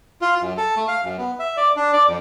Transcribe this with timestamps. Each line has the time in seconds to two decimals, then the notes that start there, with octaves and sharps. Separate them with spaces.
0.22 F4
0.42 F#2
0.57 A4
0.76 A3
0.88 F5
1.04 F#2
1.18 B3
1.39 E5
1.57 D5
1.76 D4
1.93 D5
2.07 F2